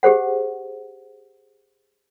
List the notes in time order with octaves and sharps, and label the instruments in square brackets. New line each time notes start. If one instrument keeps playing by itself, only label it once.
[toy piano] G4 G#4 C5 F#5